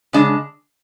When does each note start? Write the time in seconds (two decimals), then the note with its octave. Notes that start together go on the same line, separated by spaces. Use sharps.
0.13 C#3 G#3 D4